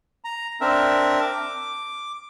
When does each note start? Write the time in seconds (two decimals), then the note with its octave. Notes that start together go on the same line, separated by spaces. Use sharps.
0.24 A#5
0.61 C4 D4 A#4 E5
1.22 D6